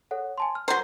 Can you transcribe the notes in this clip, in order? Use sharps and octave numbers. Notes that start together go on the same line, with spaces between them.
A4 C#5 F#5
G#5 A5 C6
F6
F#3 C5 A#5